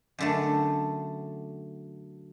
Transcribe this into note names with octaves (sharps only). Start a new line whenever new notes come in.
F#2 D3 A3